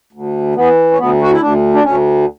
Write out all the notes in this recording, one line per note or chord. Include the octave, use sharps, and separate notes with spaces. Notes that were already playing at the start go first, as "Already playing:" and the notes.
D2
E3 B3
C#4
D2 B3
F#4
E4
D2 D4
D4
D2 C#4